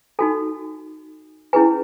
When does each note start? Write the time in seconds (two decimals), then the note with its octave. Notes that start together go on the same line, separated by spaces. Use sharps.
0.19 D#4 F#4 A4 G#5
1.53 C#4 E4 G#4 B4 G#5